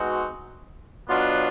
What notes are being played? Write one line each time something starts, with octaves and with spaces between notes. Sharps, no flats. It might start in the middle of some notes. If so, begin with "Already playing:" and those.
Already playing: B2 G#3 C4 D#4 F#4
B2 F#3 B3 D4 F4